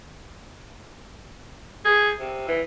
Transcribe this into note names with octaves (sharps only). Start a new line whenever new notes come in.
G#4
C3
E3